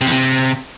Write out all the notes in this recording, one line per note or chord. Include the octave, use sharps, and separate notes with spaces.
C3
E2
C3